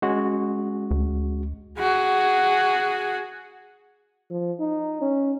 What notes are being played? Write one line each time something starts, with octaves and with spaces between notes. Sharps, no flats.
G#3 C#4 F#4
D2
F#4 G#4
F3
D#4
C#4